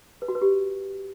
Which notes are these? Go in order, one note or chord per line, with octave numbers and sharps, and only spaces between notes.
B4
F#4
B4
G4